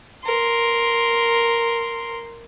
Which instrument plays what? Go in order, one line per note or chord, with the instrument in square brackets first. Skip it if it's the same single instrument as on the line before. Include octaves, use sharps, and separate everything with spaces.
[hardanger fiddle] A#4 C6